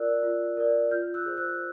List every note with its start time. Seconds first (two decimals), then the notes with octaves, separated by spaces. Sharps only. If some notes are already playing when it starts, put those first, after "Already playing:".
Already playing: F4 A#4 D5 E6 F#6
0.23 F4
0.57 A#4 D5
0.91 F4 F6 G6
1.14 E6 F#6
1.26 G#4 C5
1.37 E6 F#6